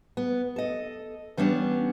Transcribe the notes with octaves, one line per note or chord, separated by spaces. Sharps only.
B3
A4 D#5
E3 G3 B3 C#4 D4